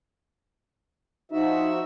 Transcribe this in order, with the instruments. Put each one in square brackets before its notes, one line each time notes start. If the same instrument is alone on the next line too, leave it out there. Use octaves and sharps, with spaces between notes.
[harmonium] F3 F#4 E5 [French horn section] D#4